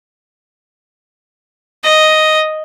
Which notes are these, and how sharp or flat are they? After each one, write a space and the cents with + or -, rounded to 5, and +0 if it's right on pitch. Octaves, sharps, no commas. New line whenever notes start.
D#5 +0